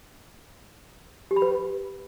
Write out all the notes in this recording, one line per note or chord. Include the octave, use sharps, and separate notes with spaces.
G4
B5
B4